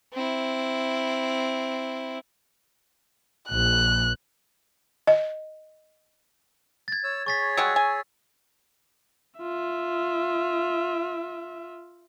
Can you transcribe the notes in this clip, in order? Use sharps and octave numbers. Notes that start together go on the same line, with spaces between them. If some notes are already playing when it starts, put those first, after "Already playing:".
C4 E4
A#1 F#6
D#5
G#6 A6
C#5 E6
G#4 C#5 C#6 A6 B6
G3 G#3 F#4 E6
G#5
F4 E5